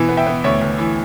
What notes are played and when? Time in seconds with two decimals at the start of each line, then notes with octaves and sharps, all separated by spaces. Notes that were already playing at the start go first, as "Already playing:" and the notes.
Already playing: B2 E3
0.09 B3
0.17 E5 G5
0.26 B3
0.44 D2 C#5 E5
0.61 D2
0.78 E3